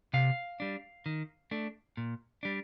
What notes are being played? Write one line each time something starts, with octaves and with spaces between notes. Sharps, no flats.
C3 F5
G3 D4
D#3
A3 D4
A#2
G3 D4